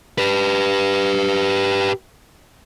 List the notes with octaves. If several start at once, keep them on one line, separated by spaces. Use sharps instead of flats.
G4 B4